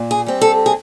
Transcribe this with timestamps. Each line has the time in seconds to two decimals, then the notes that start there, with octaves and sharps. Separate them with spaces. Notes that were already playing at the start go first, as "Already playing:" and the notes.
Already playing: A#2
0.11 G#4
0.26 G3 C4
0.41 A4
0.66 G#4